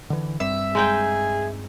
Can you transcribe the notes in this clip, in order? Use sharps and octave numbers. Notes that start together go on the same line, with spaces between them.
D3 E3
G2 G3 C4 E5
G#3 D#4 G#4 G5